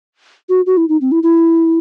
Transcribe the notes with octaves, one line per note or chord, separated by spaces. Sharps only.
F#4
F#4
E4
D#4
C4
E4
E4